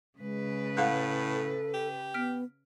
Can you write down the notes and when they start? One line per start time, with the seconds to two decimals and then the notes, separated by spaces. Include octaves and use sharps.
0.19 C#3 G#3 B4
0.77 A2 F5 F#5 F#6
1.32 A4
1.74 G4
2.14 B3 F6 B6 D7